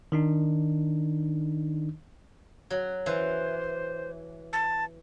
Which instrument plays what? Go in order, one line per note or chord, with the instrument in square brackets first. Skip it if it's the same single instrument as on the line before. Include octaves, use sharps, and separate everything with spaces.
[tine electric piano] D#3 D4 D#4
[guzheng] F#3
[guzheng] E3 [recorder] C5
[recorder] A5